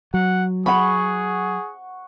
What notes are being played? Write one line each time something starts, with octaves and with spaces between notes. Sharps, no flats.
F#3 F#5
G#4 F#5 B5 C#6